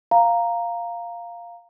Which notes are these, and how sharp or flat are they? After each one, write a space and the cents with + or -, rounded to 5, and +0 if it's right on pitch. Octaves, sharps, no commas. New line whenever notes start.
F5 +0 A#5 +0